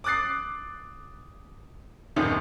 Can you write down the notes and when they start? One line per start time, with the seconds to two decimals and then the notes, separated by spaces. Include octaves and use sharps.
0.04 D6 D#6 F#6 A6 C7
2.16 D#1 A1 F#2 D#3